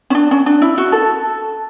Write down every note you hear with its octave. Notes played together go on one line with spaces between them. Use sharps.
C#4
D4
C#4
D4
E4
F#4
A4